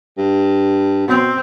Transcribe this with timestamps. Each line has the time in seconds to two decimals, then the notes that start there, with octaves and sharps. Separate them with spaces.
0.18 G2
1.08 B2 C4